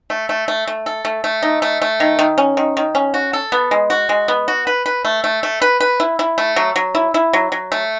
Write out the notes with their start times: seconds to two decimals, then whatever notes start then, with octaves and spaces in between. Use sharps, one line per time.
0.10 A3
0.29 A3
0.48 A3
0.67 A3
0.86 A4
1.05 A3
1.24 A3
1.43 D#4
1.62 A3
1.82 A3
2.00 D#3
2.19 D#3
2.38 C#4
2.57 D#3
2.77 D#3
2.95 C#4
3.14 F#4
3.33 A4
3.52 B3
3.71 G#3
3.90 F#4
4.09 G#3
4.28 B3
4.48 F#4
4.67 B4
4.86 B4
5.05 A3
5.24 A3
5.43 A3
5.62 B4
5.80 B4
6.00 E4
6.19 E4
6.38 A3
6.56 F#3
6.76 F#3
6.95 E4
7.14 E4
7.33 F#3
7.52 F#3
7.72 A3